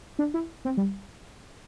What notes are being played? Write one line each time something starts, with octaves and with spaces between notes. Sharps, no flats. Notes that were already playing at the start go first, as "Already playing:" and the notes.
D4
E4
C4
G3